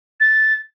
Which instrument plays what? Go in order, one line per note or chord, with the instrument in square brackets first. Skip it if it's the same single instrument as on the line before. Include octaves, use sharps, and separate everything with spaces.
[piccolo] A6